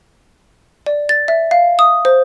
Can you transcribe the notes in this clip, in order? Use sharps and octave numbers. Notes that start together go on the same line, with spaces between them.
D5
A6
E5
F5
D#6
C5